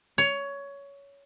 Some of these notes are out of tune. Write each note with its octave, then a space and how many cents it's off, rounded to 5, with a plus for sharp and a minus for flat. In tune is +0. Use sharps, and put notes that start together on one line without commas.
C#5 +15